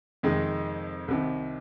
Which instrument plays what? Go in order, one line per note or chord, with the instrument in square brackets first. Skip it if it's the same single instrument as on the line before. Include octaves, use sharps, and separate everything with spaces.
[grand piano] F2 C3 D#3 G#3
C2 C3 D#3